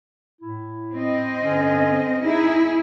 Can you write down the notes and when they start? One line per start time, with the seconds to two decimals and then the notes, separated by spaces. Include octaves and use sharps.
0.42 A2 E4
0.94 C4 D#5
1.42 G2 D3 C#4
2.23 D#4 E4 G#4